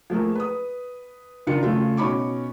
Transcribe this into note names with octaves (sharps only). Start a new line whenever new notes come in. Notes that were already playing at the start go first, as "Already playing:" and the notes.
F3 A3 A#3 G#4
B4 D#6
C#2 D#3 D4 F4 C#7
C#3 A3 F4
B2 C#4 D#4 B5 C#6 D6